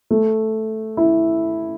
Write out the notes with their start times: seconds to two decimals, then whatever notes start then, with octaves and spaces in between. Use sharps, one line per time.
0.11 A3
0.97 E4